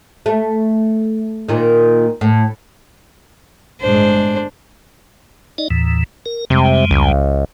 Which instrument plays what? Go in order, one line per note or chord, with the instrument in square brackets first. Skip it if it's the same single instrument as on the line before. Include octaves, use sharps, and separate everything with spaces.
[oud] A3
A#2 D#3
A2
[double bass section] G1 A2 G#3 [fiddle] D4 C5
[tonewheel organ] D#4 D5 D#5
D#2 A2 E3
A#4
[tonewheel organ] F2 G3 G#3 [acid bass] C3
[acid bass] C#2